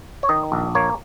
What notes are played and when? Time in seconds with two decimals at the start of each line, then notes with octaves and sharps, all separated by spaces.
0.23 C#5
0.29 D#3 D#5
0.52 A#1
0.75 A#3 C#5